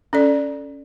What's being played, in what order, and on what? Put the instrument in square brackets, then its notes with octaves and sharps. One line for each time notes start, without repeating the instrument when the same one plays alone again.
[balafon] C#4 A4 D5